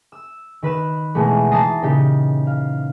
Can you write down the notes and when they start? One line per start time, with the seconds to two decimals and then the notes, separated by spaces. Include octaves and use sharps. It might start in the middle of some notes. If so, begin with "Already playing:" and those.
0.12 E6
0.62 D#3 B4 F#6 E7
1.15 B2 E3 G#3 A3
1.52 E3 A5 A#5 D#6 C7
1.82 A#2 C#3 D#4 G4
2.47 F5